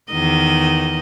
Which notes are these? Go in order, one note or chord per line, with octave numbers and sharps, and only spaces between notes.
E2 D#3 D#5